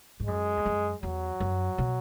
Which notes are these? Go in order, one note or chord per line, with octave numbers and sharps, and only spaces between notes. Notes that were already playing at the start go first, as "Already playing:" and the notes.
G#2
F#2 G#3
E2
F#2
E2 F#3
F#2
B2